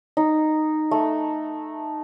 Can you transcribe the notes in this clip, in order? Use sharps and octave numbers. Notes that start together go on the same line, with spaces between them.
D#4
A3